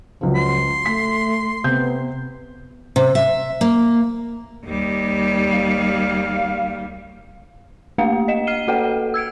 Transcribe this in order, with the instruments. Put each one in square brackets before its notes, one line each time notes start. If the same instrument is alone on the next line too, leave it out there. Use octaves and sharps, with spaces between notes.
[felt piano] C#2 F3 [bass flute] F#3
[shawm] C6
[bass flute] A3 [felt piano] B6
[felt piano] C3 G6 [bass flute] B3
[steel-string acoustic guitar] C3
E5
A#3
[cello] D#2 G3
[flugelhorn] F5
[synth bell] A3 A#3 D4 G4 F5
D#5 F5 E7
F6 C7 D#7 G7
A#3 F#4 A4 B4 F#5 G5
E6 G#6 C#7 D7